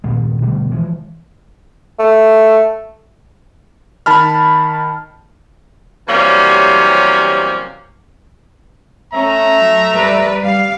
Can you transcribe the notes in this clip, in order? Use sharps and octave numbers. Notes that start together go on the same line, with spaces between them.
G2 A#2 D#3 G#3
B2 D3 G3 A3
E3 F3 G#3
A3
D#3 A5 B5 F6
C3 E3 F#3 G3 A#3 C#4
A3 C#4 E5 A#5
F#3
G3 B4 D5
G3 F5